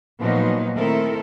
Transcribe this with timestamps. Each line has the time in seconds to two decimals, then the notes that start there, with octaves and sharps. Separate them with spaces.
0.20 A#2 F3 F#3 B3 D#4
0.77 D#3 A3 C4 E4 A4 A#4